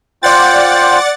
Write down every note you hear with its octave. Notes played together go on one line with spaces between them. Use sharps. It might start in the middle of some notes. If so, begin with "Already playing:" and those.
F4 C5 D5 F#5 G5 A6